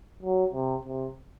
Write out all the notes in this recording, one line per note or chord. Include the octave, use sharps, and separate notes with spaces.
F#3
C3
C3